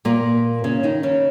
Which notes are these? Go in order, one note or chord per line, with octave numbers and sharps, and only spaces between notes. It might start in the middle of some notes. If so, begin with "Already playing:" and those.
A#2 A#3
C#3 C#4
D#3 D#4
C#3 C#4